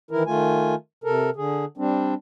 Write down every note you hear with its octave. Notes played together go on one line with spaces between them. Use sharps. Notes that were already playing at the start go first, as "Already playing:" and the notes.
D#3 E3 E4 A#4
D#3 A3 F4 G#5
C3 A4 A#4
D3 G#4
G3 C4 D4